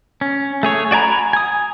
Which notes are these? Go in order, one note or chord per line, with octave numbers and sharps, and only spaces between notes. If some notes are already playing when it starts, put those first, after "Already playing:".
C#4
A3 G#4 C#5
F#4 D5 G#5 A#5 B5
G#5 D#6